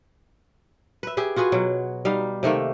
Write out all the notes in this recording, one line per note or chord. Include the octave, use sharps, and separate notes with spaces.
B4 E5
G4 G#4 E5
F4 F#4 G#4 B4
B2 F#3
G3 D#4 F5
C3 D#3 A3 A#3